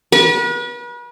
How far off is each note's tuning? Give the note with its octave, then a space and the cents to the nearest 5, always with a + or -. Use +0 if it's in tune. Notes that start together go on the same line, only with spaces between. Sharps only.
B4 -40